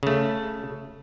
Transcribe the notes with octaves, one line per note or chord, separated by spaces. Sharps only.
C#3 A3